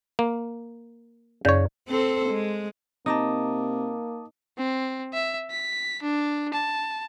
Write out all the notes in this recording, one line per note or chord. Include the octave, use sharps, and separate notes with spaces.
A#3
F#2 C#3 C#5 D5 G6
C4 A4 C5
G#3
C3 A#3 D#4 A5 D6 D#6
C4
E5
B6
D4
A5